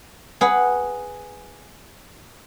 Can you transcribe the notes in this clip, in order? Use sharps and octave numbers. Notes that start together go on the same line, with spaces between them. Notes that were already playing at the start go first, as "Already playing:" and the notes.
G#4 B4 F#5